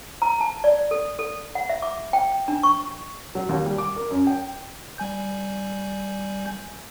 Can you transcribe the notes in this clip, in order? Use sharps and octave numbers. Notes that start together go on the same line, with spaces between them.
A#5
A5
D5
A4
A4
F#5
E5
D6
G5
D4
C#6
F#3
D#2
G3
D6
A#4
F#2
G5
G3 G#5 G6